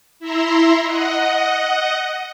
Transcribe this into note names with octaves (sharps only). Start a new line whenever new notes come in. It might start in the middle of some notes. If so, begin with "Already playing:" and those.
E4 E5 A#5 C6
D#5 F#5